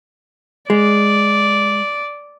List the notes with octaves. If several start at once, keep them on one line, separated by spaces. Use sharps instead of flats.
G#3 D5